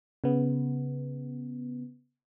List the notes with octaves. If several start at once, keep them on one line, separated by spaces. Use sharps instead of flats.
C#3 B3